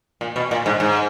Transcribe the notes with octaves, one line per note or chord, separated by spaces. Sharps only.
A#2
B2
A#2
G#2
G#2